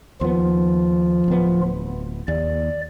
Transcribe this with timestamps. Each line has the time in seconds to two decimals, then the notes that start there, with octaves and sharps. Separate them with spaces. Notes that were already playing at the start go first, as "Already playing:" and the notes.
0.21 D#2 F3 B3 F4
1.28 D1 B3
2.28 D#2 D5